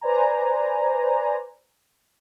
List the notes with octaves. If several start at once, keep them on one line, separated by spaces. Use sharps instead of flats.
B4 C5 D5 G#5 A#5